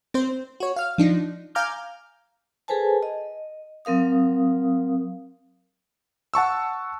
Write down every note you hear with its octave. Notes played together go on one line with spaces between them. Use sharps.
C4 C5
F#4 C#5
F5 F6
F3 D4 D#4
F5 G#5 A#5 D6 F6 G6
G#4 A4 B4 C5 G#5 A5
D#5
F#3 C4 A#4 F5 D#6
F#5 A5 C#6 E6